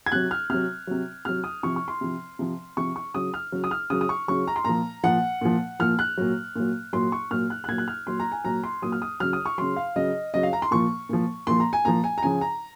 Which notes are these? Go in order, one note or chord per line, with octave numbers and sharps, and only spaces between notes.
G#6
C3 F#3 F#6
F6
C3 F#3 F6
C3 F#3
C3 F#3 F6
D#6
C3 F3 C#6
C#6
C6
C3 F3
C3 F3
C3 F3 C#6
C#6
C#3 F#3 D#6
F6
C#3 F#3
D#6
F6
C#3 F#3 D#6
D#6
C#6
C#3 F#3 C#6
A#5
C6
A#2 F3 A#5
A#2 F3 F#5
A#2 F3
A#2 F3 F6
F#6
A#2 F#3
A#2 F#3
A#2 F#3 C6
C#6
A#2 F#3 F6
F#6
F#6
A#2 F#3 G#6
F#6
F6
A#2 F#3 C6
A#5
G#5
A#2 F#3 A#5
C6
A#2 F#3 D#6
F6
D#6
C#3 F#3 F6
D#6
C#6
C#3 F#3 C6
F5
C#3 F#3 D#5
C#3 F#3 D#5
F5
A#5
C6
A#2 F3 C#6
A#2 F3
A#2 F3 C6
A#5
G#5
A#2 F3 A#5
G#5
A#5
C#3 F3 G#5
A#5